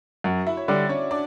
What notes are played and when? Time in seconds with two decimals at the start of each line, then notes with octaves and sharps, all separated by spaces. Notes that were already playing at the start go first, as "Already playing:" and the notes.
0.24 F#2 F#4 F#5
0.47 E4 E5
0.57 C#5
0.68 D3 G3 D4 D5
0.89 C#4 C#5
1.11 D4 D5